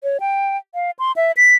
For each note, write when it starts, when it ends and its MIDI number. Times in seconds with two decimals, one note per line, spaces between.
0.03 0.17 73
0.20 0.57 79
0.75 0.91 77
0.99 1.12 84
1.16 1.32 76
1.37 1.55 95